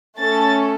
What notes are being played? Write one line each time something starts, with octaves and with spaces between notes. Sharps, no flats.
A3 C#4 A4 A6